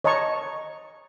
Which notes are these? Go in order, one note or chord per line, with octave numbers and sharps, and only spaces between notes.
C#5 D#5 A5 A#5 C#6